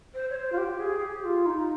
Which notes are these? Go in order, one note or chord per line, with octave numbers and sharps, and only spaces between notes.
C5
C#5
C5
F4
G4
G#4
G4
F4
D#4